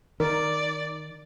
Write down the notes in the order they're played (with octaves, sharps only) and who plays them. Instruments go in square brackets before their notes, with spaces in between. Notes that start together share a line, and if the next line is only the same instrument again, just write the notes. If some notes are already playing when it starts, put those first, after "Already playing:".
[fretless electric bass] D#3 [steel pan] A#4 [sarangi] D5